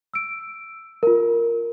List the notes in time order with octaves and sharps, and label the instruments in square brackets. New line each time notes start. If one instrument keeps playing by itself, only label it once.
[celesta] E6 D7
F4 A#4